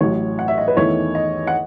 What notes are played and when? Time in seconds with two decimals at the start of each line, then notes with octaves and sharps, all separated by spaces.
0.01 A1 A2 F#3 C#5
0.39 F#5
0.48 E5
0.58 D#5
0.68 B4
0.76 E2 D#3 A3 E4 C#5
1.15 D#5
1.47 F#5